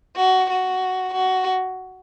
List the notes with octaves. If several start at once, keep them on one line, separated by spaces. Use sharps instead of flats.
F#4
F#4
F#4